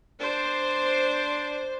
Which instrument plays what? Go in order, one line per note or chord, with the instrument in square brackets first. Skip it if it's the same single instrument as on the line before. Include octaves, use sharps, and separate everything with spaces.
[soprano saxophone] D4 [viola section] C5